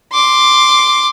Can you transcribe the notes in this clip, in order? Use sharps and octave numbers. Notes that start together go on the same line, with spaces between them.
C6 D6